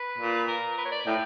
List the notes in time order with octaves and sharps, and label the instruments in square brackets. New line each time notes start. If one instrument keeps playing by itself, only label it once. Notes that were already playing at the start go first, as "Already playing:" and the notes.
Already playing: [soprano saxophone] B4
[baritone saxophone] A#2
[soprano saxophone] A#4
B4
C#5
D5
[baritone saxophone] A2 [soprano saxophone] G5